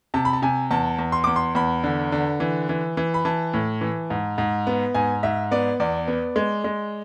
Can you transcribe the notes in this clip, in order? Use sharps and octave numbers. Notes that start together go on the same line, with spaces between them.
C3 A5
B5
A5
C3 G#5
E2 A5
E2
C6
E2 D6
C6
E2 B5
D3
D3
E3
E3
E3
B5
E3 A5
A2
E3
G#2
G#2
B3
G#2 G#5
G#2 E5
B3 D5
E2 D5
B3
G#3
G#3